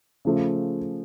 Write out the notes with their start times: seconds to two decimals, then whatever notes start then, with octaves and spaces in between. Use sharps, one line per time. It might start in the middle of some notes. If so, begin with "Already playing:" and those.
0.25 C#3 F3 A3